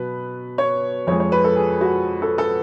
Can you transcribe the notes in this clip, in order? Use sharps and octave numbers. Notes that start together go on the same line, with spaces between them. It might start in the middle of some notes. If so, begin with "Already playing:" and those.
Already playing: B2 F#3 B4
C#5
F2 F3 G#3 C#5
C#5
B4
A4
G#4
F#4
A4
A4